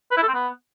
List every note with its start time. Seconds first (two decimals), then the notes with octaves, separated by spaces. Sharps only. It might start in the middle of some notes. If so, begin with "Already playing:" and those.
0.11 B4
0.17 E4
0.23 A4
0.28 C4
0.34 B3